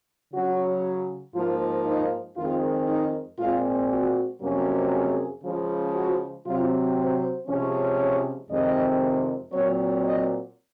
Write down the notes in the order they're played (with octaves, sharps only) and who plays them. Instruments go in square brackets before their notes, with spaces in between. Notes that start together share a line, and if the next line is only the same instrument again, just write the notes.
[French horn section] C#3 F#3 C#4 F#4
G#2 F3 A#3 F4
D#4
F2 D#3 G#3 C4 F4
D#4
A#2 G#3 C4 F4
F#4
F2 C3 F#3 A#3 C#4
G#4
C#3 F3 G#3
F#4
C3 F#3 C4 F4
C5
C3 F3 G#3 C#4
C#5
F2 C3 D#3 G#3 C4 D#5
A#2 F#3 C4 C#5
D#5